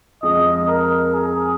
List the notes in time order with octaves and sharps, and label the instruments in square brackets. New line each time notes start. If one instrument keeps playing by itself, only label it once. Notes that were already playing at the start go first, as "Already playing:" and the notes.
[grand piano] F2 F3 G#3 [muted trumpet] D#5
[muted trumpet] A#4
G#4